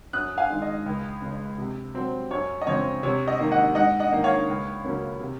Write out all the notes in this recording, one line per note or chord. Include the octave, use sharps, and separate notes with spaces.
F#2 D#6 F#6
F5 G#5
D#3 G#3
D#5
C#2
C#3 G#3
C3
F#3 C4
F#2 C#5
D#5
C#3 F3 C4 C#5
C3 C#5
D#5
D#3 A#3
D#5 F#5
G#2 D#5 F#5
D#5 F#5
D#3 A#3 D#4
C#5 F5
C#2
C#3 F#3 A#3 C#4
C3